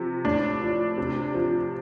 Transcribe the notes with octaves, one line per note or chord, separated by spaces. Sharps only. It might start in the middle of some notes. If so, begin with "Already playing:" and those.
Already playing: C3 F3
A2 D4
F3
C3
F3